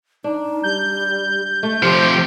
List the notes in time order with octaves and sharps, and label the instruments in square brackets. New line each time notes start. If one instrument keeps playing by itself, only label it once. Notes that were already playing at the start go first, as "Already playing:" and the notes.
[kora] D4 [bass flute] D#4
[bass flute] G3 [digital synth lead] G6
[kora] A3
[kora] C3 C4 G5 [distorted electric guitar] F3 G4 [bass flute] C5